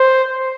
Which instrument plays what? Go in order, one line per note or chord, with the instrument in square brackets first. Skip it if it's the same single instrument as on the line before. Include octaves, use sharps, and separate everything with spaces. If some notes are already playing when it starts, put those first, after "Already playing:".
Already playing: [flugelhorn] C5